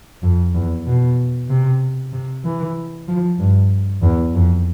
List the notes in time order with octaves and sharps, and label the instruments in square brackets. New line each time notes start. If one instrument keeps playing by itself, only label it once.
[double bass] F2
E2
B2
C3
C3
E3
F3
G2
E2
F2